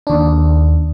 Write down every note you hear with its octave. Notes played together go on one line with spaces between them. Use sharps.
D#2 D4